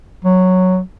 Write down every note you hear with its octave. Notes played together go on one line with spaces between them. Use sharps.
F#3